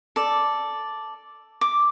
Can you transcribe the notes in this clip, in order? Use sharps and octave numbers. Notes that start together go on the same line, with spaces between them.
A4 D5
D6